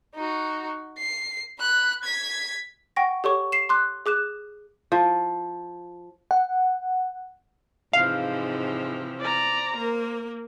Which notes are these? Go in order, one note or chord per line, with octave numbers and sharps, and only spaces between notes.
D#4 F#4
C7
B5 F#6
G#6 B6
F#5 G5 C#6 A#6
G4 A4 C#5 C#6
C7 E7
C6 D6 F#6
G#4 D6 F#6 E7
F3
F#5
G#2 C3 E3 F3 F5
C5 D5 A#5
A#3 A#4